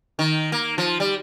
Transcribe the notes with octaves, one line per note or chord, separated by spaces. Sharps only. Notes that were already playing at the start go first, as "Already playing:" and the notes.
D#3
A#3
F3
G3